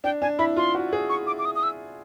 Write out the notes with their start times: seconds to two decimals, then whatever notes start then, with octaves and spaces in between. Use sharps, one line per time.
0.04 D4 G5
0.22 D4 G#5
0.39 E4 B5
0.57 F4 C6
0.75 F#4
0.93 G#4
1.09 C#6
1.27 D6
1.39 D6
1.45 D#6
1.56 D#6
1.63 E6